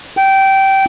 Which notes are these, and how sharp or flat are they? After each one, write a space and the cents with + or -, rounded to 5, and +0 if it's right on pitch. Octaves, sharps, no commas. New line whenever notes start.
G5 -15